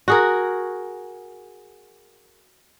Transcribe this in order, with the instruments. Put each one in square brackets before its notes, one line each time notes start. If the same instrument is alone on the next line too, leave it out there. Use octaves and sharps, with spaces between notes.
[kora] F#4 G#4 A#4